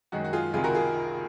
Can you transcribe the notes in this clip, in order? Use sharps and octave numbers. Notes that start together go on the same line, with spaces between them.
F#2 D#3 G#3 F#4
F#4
F4 G#4
C#2 C3 D#3 F4 G#4
F#4 A#4
F4 G#4